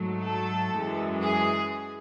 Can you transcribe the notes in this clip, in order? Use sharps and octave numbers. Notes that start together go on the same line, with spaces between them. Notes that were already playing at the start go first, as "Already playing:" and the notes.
Already playing: G#2 F#3 A3
A4
F#2 E3 G#3
G#4